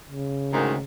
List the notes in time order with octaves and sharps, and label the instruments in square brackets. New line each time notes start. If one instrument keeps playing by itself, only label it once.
[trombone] C#3
[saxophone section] D2 G#2 D#3